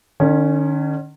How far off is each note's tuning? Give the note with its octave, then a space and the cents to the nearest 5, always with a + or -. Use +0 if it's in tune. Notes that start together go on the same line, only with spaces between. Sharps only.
D#3 -45 C#4 +0